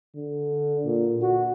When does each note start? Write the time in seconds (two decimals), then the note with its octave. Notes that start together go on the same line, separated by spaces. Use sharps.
0.15 D3
0.85 A#2
1.22 F#4